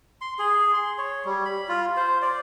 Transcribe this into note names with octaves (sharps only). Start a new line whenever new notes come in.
C6
G#4
C6
C#5
G3
B5
F4
C5
D5